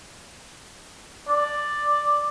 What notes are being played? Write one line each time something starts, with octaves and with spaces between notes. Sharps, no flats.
D5